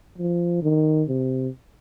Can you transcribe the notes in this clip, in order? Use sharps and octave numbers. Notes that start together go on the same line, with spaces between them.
F3
D#3
C3